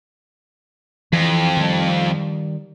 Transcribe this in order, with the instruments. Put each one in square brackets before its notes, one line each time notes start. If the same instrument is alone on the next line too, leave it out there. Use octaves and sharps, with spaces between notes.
[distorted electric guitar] F2 [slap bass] E3
[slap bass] D#3 G3